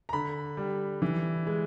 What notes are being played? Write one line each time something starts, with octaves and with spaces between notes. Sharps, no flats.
A#5
D3 B5
G3
E3
G#3